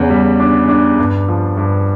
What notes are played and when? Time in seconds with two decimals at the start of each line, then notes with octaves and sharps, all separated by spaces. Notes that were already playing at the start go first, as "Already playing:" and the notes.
Already playing: E2 C#3
0.10 G3
0.40 D4
0.69 D4
0.99 G2
1.28 F3
1.57 G2